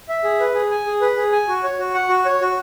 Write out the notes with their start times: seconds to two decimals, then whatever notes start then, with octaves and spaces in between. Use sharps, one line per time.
0.09 E5
0.24 G#4
0.40 B4
0.54 G#4
0.71 G#5
0.86 G#4
1.02 B4
1.16 G#4
1.32 G#5
1.48 F#4
1.63 C#5
1.79 F#4
1.94 F#5
2.09 F#4
2.26 C#5
2.41 F#4